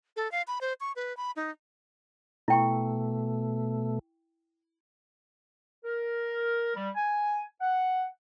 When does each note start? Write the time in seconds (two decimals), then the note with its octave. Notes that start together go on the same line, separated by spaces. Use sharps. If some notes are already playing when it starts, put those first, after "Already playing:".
0.16 A4
0.32 F5
0.48 B5
0.61 C5
0.81 C#6
0.96 B4
1.17 B5
1.36 D#4
2.48 B2 A3 E4 G5 C#6
5.84 A#4
6.75 G3
6.95 G#5
7.60 F#5